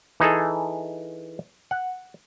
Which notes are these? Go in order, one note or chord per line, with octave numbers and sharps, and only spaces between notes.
E3 D#4 G#4 A4
F#5